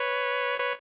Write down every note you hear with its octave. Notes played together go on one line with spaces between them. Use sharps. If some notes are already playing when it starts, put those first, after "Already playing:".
Already playing: B4 C#5
B4 C#5